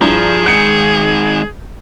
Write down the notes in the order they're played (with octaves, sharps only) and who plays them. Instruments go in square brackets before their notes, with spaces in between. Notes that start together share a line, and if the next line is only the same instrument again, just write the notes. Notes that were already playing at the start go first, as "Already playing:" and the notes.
[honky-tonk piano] G2 E4 A#5 [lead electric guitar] F3 [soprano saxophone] G#4
[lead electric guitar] G#2 D#3 [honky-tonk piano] G6 C#7